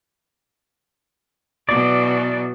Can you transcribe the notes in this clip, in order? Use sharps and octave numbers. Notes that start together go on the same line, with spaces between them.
B2 E3 F#3 D5